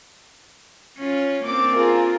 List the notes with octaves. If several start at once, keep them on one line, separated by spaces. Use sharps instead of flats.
C#4 F4
A#3 C4 D4 D6
F4 G#4 A#4